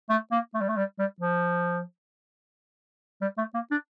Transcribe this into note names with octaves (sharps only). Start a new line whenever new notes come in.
A3
A#3
A3
G3
A3
G3
G3
F3
G3
A3
A#3
D4